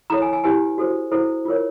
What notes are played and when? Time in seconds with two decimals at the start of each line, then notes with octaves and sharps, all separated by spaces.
0.10 E4 A4 C#5 A#5
0.22 G#5
0.33 G#5
0.44 E4 G4 B4 G#5
0.78 F#4 A4 C5
1.12 E4 A4 C5
1.45 F4 A#4 C#5